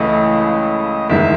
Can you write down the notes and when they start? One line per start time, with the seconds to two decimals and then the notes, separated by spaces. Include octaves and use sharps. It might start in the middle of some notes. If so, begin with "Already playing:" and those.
Already playing: C#2 C#3 E3 A3 D#5
1.09 F#1 E2 D#3 G#3 E5